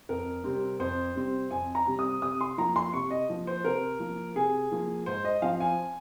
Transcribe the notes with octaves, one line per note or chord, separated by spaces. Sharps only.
F2 A#4
C3 G3 C4
F2 C5
C3 G3 C4
F2 G#5
A#5
C3 G3 C4
D#6
C3 D#6
C6
F3 A#3 A#5
C6
C3 C#6
D#5
F3 A#3
C5
C3 A#4
F3 A#3
C3 G#4
F3 A#3
G#2 C5
D#5
F3 C4 F5
G#5